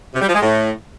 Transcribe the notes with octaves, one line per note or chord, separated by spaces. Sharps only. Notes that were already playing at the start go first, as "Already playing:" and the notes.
C3
G3
F3
G#3
A2